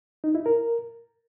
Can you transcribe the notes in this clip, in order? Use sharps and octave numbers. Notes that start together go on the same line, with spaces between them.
D#4
E4
A#4